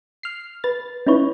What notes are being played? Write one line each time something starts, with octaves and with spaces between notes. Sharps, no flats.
F6 C7
B4 A6
C#4 D#4 E4 B4 C#5